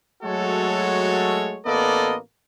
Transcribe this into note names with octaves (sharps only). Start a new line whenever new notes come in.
F#3 G#3 A3 F#4 A4 C#5
A1 A#3 B3 A4 D5 D#5